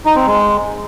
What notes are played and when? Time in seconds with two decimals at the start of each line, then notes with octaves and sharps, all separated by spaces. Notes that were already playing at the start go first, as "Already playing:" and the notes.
0.06 D#4
0.16 C4
0.26 G#3